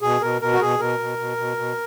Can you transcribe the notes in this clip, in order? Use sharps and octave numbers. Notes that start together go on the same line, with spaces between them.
B2 G#4
B2 A#4
B2 A#4
F#4
B2 G#4
B2 A#4
B2
B2
B2
B2